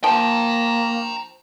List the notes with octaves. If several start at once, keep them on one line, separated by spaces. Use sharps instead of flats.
F3 A#3 G5 A#5